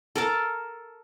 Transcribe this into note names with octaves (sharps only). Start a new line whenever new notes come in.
A4 A#4 A5